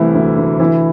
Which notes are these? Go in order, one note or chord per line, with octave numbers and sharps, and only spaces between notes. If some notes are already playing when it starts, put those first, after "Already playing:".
Already playing: C2 C3 E3 A3 E4
D2
D2
E3 E4